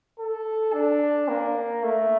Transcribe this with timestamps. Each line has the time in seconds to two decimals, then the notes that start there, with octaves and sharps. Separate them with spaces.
0.19 A4
0.74 D4
1.28 A#3
1.83 A3